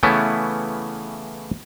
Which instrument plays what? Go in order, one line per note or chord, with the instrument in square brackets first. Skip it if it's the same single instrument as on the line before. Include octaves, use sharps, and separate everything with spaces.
[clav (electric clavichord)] C#3 E3 A3 B3 C#4 E4